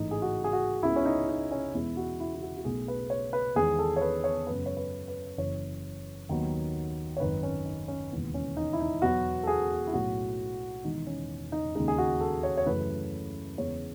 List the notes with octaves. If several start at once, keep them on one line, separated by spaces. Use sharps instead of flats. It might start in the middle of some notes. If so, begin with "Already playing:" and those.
Already playing: A1 G#2 E3 A3 D#4
G#4
F#4
G#4
F#4
C#2 C#3 G#3 B3 E4
C#4
D#4
D#4
C#4
E2 B2 G#3 B3 E4
F#4
E4
E4
F#4
F#4
B1 B2 A3 G#4
B4
C#5
B4
E2 D#3 G#3 B3 G#4
A4
C#5
B4
C#5
F#2 C#3 G#3 B3 B4
C#5
B4
B4
F#1 F#2 C#3 E3 C#5
D#2 D#3 F#3 B3
C#5
G#1 F#2 D#3 B4
C#4
D#4
C#4
E1 D#2 C#3 E3 B3
C#4
D#4
E4
D#4
E2 B2 F#3 B3 F#4
A4
G#4
E4
B1 A2 F#3 A3 F#4
E1 E2 D#3 D#4
C#4
D#4
D#2 C#3 G#3 D#4
G#4
F#4
A4
C#5
C#5
F#2 C#3 E3 A3 B4
E2 C#3 G#3 B3 C#5